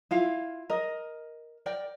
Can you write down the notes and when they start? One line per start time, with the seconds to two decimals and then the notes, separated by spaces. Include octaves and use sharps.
0.11 E4 F4 F5
0.70 A#4 D#5
1.66 A#4 D5 G5